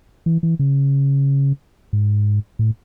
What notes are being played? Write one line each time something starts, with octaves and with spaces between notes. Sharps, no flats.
E3
E3
C#3
G#2
A2